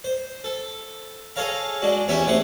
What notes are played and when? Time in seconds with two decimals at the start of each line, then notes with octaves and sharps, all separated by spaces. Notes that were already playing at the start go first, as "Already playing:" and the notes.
0.04 C5
0.44 A4
1.36 G#4 A4 C#5 F5 A#5
1.82 G#3 D4 F#4
2.08 E2 C#4 G4 C#5 E5 C#6
2.27 C3 A3 F#5 C6